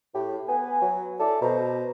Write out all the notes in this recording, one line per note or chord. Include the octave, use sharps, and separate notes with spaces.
A2 G4
B3 B4 G#5
F#3
E4 A4 D5
B2 C5 A#5